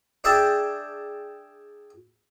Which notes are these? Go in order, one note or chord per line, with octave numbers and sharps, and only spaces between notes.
D4 G#4 E5 G5 A5